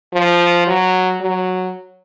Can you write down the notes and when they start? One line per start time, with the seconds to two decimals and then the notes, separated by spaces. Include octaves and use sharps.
0.13 F3
0.67 F#3
1.21 F#3